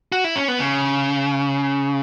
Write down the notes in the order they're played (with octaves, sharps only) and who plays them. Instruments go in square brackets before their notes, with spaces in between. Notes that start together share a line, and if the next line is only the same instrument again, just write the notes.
[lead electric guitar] F#4
E4
C#4
B3
C#3